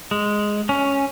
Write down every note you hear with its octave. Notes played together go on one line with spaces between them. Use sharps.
G#3
C#4